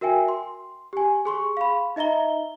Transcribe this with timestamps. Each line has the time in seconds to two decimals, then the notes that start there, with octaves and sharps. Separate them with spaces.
0.01 F#4 A#4 E5 G5 G#5
0.28 C6
0.93 G4 G#5
1.25 G#4 C6 C#6
1.57 F5 B5
1.96 D#4 D#5 E5 A#5 G7